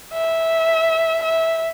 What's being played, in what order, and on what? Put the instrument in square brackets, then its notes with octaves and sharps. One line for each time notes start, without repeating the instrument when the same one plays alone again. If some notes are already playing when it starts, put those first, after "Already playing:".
[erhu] E5
E5